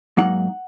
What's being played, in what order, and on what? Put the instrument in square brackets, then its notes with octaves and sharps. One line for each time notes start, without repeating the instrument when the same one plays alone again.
[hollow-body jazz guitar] G#2 F#3 A#3 D#4 F#5